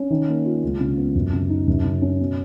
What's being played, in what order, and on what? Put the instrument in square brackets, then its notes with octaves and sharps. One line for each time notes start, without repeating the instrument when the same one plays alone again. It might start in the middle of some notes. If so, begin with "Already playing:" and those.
Already playing: [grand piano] C#4
D#3
A#3
F4
C#2
C#3
B3
F#2
C#3
D#4
F#2
C#3
C#4
B2